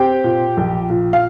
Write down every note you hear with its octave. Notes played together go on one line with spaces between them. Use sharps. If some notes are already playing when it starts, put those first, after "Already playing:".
Already playing: C4 G4 G5
A#2
A#1
A#2
F5